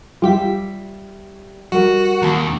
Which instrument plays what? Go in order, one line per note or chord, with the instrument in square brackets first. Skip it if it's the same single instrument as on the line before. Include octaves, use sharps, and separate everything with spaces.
[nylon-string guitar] G3 E5 [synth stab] F4 G4 B6
[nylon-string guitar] G3 A#4 [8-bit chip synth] F#4
[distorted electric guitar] D#2 [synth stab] A5 A#5